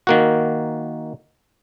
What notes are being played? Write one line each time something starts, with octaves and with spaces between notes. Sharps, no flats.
D#3 A#3 F#4